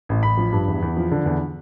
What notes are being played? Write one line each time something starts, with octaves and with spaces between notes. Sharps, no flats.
A1
A1 B5
F3
G2
E2
E2
F3
D3
E2